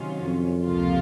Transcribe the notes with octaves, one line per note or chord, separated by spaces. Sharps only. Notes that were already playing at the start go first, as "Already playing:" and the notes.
Already playing: C3 D#3 F#3 C#4 F4
F2
C#2 C3 F3 A#3 F4